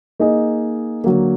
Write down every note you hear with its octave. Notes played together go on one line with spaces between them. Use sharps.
A#3 D#4 G#4 D#5
D3 F#3 A#3